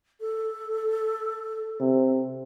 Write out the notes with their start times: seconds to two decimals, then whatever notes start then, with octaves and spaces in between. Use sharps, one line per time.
0.21 A4
1.80 C3